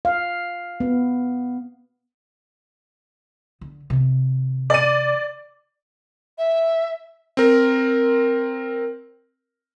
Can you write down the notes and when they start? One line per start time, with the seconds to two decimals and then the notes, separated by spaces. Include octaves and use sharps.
0.05 F5
0.80 B3
3.61 D3
3.90 C3 D#3
4.70 D5 D#7
6.38 E5
7.37 C4 A#4